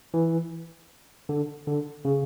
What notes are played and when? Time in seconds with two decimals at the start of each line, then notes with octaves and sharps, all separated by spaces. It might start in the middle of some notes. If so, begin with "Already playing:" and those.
0.14 E3
1.29 D3
1.67 D3
2.05 C#3